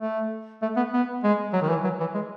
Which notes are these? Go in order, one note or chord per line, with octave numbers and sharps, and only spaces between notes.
A3
A3
B3
B3
G#3
F#3
D#3
E3
F#3
E3
G#3